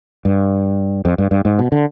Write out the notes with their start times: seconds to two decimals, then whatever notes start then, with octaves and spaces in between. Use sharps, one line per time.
0.25 G2
1.05 F2
1.18 G2
1.31 G2
1.45 G#2
1.59 B2
1.72 D3